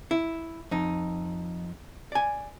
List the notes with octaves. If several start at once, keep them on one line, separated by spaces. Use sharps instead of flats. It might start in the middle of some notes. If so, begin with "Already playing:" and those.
E4
F2 D#4
D5 G#5